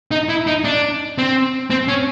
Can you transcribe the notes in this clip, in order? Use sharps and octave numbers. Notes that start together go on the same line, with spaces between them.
D#4
E4
D#4
D4
C4
C4
C#4